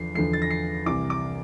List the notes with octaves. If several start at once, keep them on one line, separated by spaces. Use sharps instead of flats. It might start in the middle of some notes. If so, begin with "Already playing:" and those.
Already playing: E2 D3 F3 C7
E2 D3 F3 C7
A6
A#6
C7
C2 C3 E3 D6
D6